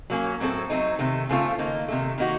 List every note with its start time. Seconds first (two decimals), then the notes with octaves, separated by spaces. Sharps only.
0.10 F#3 A#3 C#4
0.40 A2 F#3 C4 D#4 A4
0.70 F#3 A3 C4 D#4
0.99 C3 D#3 A3
1.29 C#3 A3 C4 F4 A4
1.59 D#3 A#3 D#4
1.89 C3 D#3 A3
2.18 D#3 A#3 D#4 F#4